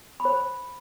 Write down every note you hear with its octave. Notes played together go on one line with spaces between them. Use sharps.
B5
C5
B5